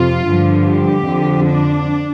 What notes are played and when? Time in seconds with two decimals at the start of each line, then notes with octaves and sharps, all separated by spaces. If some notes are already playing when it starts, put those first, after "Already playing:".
Already playing: F2 C3 F4
0.26 G2 D3 F3
0.66 G4
1.05 F2 D3 F3
1.45 D4